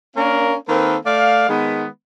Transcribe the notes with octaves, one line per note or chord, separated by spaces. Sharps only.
A#3 C#4 D4 A#4 F5
D#3 A#3 C4 A4 B4
A3 D5 F5
D#3 G#3 B3